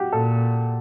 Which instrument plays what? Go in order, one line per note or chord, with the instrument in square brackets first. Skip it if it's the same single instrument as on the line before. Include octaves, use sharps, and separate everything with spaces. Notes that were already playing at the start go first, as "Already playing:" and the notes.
Already playing: [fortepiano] F#4 G4
[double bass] A#2 [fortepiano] A4